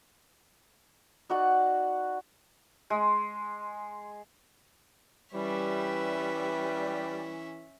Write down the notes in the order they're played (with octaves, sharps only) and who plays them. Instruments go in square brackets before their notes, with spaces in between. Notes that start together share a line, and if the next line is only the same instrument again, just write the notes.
[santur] D#4 F#4 D5 F#5
G#3
[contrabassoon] E3 [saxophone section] G3 [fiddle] C#4 E5 [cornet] B4